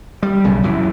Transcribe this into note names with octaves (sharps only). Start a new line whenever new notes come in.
G3
B1 C#3
F#2 E3